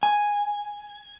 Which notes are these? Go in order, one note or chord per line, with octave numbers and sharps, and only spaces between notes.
G#5